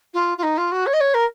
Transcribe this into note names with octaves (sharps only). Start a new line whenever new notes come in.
F4
F4
D#4
F4
F#4
C#5
D#5
C#5
A#4